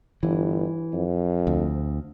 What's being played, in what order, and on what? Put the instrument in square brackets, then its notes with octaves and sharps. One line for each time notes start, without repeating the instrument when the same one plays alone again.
[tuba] G1 [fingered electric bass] E3
[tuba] F2
[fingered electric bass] D2